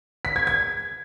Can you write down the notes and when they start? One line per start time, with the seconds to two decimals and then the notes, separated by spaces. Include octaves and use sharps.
0.25 B6
0.36 G#6
0.47 G#6